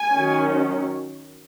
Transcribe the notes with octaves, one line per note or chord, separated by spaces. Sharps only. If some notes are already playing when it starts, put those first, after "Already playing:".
Already playing: G#5
D#3 F#3 C#4